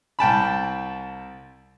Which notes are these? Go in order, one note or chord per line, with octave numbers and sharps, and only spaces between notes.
C2 G5 A5 B5